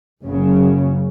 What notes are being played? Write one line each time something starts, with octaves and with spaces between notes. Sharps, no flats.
F#1 F#2 C#3